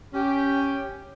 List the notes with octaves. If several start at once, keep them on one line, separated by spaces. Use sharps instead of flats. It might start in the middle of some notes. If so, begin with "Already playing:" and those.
C#4 G4